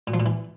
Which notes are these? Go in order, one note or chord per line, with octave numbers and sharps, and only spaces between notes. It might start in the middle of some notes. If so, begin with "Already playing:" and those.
A#2
F3
A#2
E3